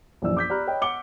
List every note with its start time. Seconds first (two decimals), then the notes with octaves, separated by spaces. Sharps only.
0.22 A#1 F#2 E3 D5 E6
0.37 D6 G6 B6
0.49 G4 D5 A#5 B5 F6 F#6
0.67 C#5 D#5 G5 B5
0.82 F#5 D6 C#7 G7